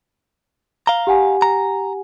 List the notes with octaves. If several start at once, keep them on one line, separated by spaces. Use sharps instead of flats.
F5 A#5 G7
G4 F#5 G#5
A#5